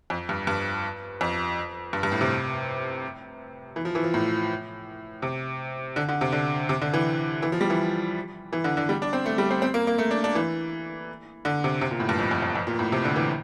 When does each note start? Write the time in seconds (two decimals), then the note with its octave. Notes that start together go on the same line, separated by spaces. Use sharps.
0.10 F2
0.29 G2
0.47 G2
1.21 F2
1.93 G2
2.03 G2
2.12 A2
2.21 C3
3.76 E3
3.85 F3
3.95 E3
4.04 F3
4.14 A2
5.22 C3
5.96 D3
6.09 D3
6.21 C3
6.32 D3
6.69 C3
6.82 D3
6.94 E3
7.42 E3
7.52 F3
7.61 G3
7.70 E3
8.53 E3
8.64 D3
8.77 D3
8.89 G3
9.02 D4
9.13 C4
9.26 A3
9.38 G3
9.51 C4
9.62 C4
9.74 A#3
9.87 A#3
9.98 A3
10.11 D4
10.24 D4
10.35 E3
11.45 D3
11.64 C3
11.81 C3
11.91 A#2
12.00 A2
12.09 G2
12.19 F2
12.31 F2
12.42 F2
12.55 F2
12.67 A#2
12.79 A2
12.92 C3
13.05 D3
13.16 E3